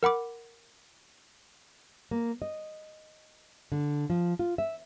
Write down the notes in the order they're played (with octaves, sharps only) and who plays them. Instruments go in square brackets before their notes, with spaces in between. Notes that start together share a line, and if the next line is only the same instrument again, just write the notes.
[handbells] A#4 F#5 B5 D6
[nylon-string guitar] A#3
D#5
D3
F3
F4
E5